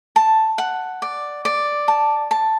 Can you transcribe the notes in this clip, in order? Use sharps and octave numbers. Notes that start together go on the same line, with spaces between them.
A5
F#5
D5
D5
A5
A5